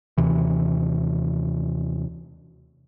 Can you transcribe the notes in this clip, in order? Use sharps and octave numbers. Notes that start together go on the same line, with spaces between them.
D#2 C3 E3